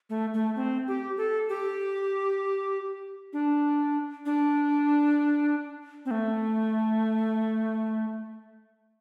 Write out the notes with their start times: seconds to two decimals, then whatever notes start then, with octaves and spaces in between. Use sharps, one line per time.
0.10 A3
0.34 A3
0.56 C4
0.88 G4
1.17 A4
1.49 G4
3.33 D4
4.26 D4
6.06 C4
6.11 A3